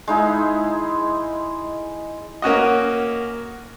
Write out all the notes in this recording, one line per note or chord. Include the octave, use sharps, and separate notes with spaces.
G#3 D#4 E4
A#3 C#4 F#4 D#5